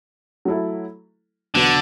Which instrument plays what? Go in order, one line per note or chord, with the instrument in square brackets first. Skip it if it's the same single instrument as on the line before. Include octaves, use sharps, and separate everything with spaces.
[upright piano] F#3 A3 E4 A4
[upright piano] E2 B2 F#3 B3 [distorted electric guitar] D3